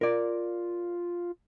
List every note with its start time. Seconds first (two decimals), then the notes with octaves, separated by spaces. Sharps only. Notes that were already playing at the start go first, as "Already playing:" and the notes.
0.01 F4 A#4 D5